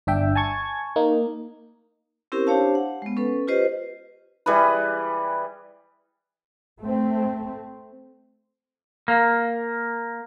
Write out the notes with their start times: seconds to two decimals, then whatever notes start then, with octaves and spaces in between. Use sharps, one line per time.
0.07 G1 D4 E5 G5
0.36 G#5 A5 C#6 G#6
0.96 A#3 D#4
2.32 C4 C#4 E4 G4 A#4 C5
2.47 D4 G4 C5 C#5 F5 A5
2.75 F#5
3.02 G#3 B3
3.17 C#4 A4 B4
3.48 F4 G4 B4 C5 D#5
4.46 E3 G3 G#4 B4
6.80 A3 C4
9.08 A#3